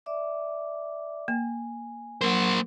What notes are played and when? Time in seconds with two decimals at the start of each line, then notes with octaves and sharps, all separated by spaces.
0.06 D5 E5 D6
1.28 A#3 G#5
2.21 F#3 A#3 A#4 C5 F#5